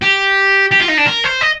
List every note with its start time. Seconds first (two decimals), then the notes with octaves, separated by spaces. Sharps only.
0.02 G4
0.72 G4
0.81 F4
0.89 D#4
0.98 D4
1.07 A#4
1.25 C5
1.42 D#5